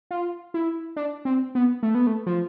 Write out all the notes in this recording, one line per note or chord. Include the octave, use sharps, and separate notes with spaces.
F4
E4
D4
C4
B3
A3
B3
A3
F3